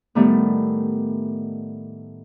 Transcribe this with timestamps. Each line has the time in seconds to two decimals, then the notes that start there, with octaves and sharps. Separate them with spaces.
0.15 A2 D#3 G3 A3 B3